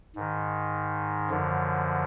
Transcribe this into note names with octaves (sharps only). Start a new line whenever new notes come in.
G#2 D#3
F#2 D3 F3